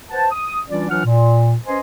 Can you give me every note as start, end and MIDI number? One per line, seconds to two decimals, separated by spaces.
0.11 0.27 71
0.11 0.27 72
0.11 0.27 78
0.11 0.27 81
0.31 0.59 87
0.68 0.86 52
0.68 0.86 55
0.68 0.86 61
0.68 0.86 62
0.68 0.86 65
0.68 0.86 74
0.90 1.05 52
0.90 1.05 54
0.90 1.05 62
0.90 1.05 65
0.90 1.05 78
0.90 1.05 89
1.05 1.55 46
1.66 1.80 61
1.66 1.80 71
1.66 1.80 72
1.66 1.80 75
1.66 1.80 80
1.66 1.80 84